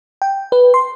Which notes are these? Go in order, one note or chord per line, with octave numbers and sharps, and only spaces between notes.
G5
B4
C6